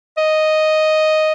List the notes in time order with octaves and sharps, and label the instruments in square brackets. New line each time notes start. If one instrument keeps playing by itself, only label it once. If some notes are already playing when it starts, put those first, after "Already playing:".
[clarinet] D#5